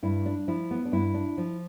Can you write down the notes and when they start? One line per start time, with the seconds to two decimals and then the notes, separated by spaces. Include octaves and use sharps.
0.03 G2 E4
0.26 D4
0.48 F3 E4
0.71 B3
0.85 D4
0.92 G2 E4
1.14 D4
1.38 F3